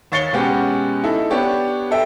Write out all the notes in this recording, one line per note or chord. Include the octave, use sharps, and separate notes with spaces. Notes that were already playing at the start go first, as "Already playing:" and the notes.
D#2 C#5 A6 C7 C#7 G7
B2 G#3 B3 C#4 F#4 G4
D#4 E4 A4
B3 D4 G4 C#5
A4 E5 G5